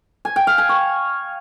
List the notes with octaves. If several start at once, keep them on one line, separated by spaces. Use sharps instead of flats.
G#5
G5
F5
G#5
C#6